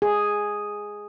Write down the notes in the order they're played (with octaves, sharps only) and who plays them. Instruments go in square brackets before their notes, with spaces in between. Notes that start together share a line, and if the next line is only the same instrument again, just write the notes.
[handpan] G#4